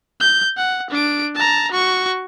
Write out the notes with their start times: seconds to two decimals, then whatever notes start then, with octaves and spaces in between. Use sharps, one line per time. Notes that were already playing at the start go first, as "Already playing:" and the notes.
0.21 G6
0.57 F#5
0.91 D4 D7
1.35 A5 A#5
1.72 F#4 C#6